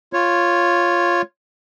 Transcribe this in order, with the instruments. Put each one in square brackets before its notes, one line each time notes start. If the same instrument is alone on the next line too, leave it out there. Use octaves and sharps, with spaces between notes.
[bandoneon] F4 C#5